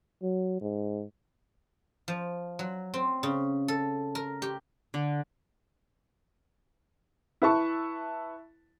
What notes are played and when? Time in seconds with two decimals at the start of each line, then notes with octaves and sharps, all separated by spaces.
0.23 F#3
0.61 G#2
2.08 F3
2.59 F#3
2.94 C4
3.23 C#3
3.68 A4
4.15 A#4
4.42 G4
4.94 D3
7.42 E4 B4 E5 A5 C#6